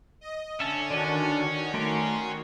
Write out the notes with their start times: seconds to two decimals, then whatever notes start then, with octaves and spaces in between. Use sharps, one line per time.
0.21 D#5
0.60 D3 C#4 E5 A5
0.90 D3 D#3 D4 F#4 D5 G#5
1.74 A3 A#4 D5 C6